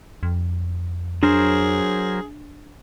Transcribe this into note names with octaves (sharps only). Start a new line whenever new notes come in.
F2
F#3 D4 G#4 A#4 C5